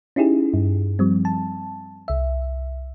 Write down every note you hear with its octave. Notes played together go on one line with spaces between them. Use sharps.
C#4 D#4 E4 G4 G#4
G2
F3 G3 C4
A5
C2 E5